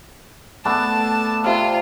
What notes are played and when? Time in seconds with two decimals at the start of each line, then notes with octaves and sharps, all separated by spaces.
0.65 A3 B3 D4 A5
1.44 C3 F4 F5